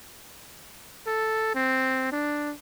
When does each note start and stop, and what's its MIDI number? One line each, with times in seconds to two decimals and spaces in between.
1.06 1.53 69
1.54 2.08 60
2.12 2.53 62